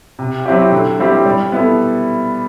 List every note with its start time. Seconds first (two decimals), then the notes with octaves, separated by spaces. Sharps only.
0.19 C3
0.46 F#3 C4 E4 G4
0.72 D3
1.00 G3 C4 E4 G4
1.25 G3
1.52 B3 E4 A4